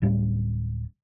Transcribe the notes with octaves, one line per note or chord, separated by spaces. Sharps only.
D1 A2 G3 C#4